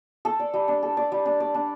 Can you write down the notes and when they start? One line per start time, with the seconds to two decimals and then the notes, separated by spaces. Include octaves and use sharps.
0.25 A4
0.40 D5
0.54 G3
0.68 D4
0.83 A4
0.97 D5
1.12 G3
1.26 D4
1.40 D5
1.54 D4